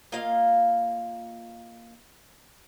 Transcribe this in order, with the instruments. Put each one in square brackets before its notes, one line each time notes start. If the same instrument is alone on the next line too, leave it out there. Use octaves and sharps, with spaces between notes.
[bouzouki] A#3 F4 D#5 F5